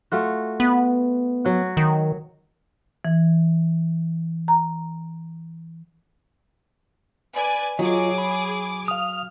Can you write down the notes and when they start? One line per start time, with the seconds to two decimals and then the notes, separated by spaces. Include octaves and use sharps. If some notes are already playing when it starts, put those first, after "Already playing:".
0.12 A3 F4 F#4
0.60 B3
1.45 F#3 F#4
1.77 D#3
3.05 E3
4.48 A#5
7.35 B4 D5 G#5
7.79 F#3 F4 G#4 D#5 D6
8.18 B5
8.88 F5 D#6 F6